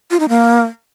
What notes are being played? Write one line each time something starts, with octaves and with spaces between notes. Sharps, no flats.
F4
D#4
A#3